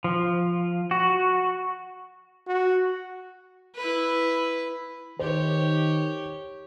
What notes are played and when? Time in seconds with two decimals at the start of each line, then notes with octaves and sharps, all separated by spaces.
0.04 F3
0.91 F#4
2.47 F#4
3.76 E4 B4
5.19 D#3 G4 C5 C#5